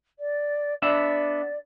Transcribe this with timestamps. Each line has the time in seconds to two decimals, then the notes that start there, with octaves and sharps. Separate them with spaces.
0.19 D5
0.82 B3 D4 D5 E5